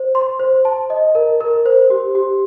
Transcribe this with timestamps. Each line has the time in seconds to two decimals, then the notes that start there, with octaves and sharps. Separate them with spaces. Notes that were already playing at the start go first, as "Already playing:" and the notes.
Already playing: C5
0.15 C6
0.40 C5
0.65 A5
0.90 D#5
1.15 A#4
1.41 A#4
1.66 C5
1.90 G4
2.15 G4